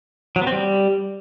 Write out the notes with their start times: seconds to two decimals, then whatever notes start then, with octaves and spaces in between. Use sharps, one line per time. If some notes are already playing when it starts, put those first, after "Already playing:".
0.36 F#3
0.41 B3
0.47 C4
0.52 G3